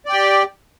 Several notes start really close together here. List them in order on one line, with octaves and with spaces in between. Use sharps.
D5 G5 G4